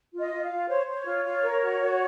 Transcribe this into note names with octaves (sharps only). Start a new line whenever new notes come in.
F4
D#5
F4
F5
F4
C5 C#5
C5
C#5
F4
F4
A#4
F#4
F#4